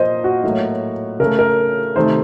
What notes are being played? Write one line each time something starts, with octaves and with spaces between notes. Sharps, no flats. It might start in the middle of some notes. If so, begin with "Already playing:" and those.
Already playing: A#2 F3 A#3 C5 D#5
F#4
A2 F#3 A#3
C#3 A3 A#4
A#4
C3 D#3 A3 C5